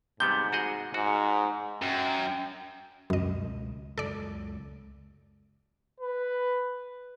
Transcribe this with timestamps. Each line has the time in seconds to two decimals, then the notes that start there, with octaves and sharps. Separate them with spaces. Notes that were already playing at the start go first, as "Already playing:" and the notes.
0.20 G#2 C3 G3 B3 G6
0.53 F#4 G#4 D#5
0.94 G#2 F#4
1.82 F#2 G5
3.10 C#2 F#2 B2 D#5
3.98 C#2 F#2 A4 D5
6.00 B4